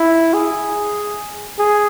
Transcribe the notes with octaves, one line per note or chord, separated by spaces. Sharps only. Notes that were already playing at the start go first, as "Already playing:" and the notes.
Already playing: E4
G#4
G#4